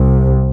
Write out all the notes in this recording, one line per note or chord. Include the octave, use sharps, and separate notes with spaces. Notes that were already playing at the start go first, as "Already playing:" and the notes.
Already playing: C2 C3